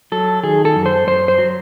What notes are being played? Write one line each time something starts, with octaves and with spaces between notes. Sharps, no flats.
F#3 A4
D#3 G#4
A4
F#2
C5
F#2 C5
C5
F#3